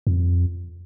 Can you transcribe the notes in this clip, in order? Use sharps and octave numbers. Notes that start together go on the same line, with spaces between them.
F2